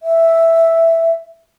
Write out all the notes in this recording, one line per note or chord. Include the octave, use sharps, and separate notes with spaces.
E5